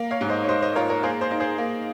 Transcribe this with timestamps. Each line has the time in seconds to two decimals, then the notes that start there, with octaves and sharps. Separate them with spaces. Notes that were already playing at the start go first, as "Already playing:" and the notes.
Already playing: A#3
0.11 C#5 F5
0.21 G#2
0.30 C5 D#5
0.44 C#5
0.48 G#2 C5 D#5
0.62 C5 D#5
0.75 F4 A#4 C#5
0.90 A#4 C#5
1.03 A#3 G#4 C5
1.21 G#4 C5
1.31 D#4
1.40 G#4 C5
1.58 A#3